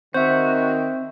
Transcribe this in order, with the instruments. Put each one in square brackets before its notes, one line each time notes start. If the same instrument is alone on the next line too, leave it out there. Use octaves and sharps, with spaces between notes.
[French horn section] D#3 [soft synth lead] C4 [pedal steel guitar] F#4 [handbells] C5 E5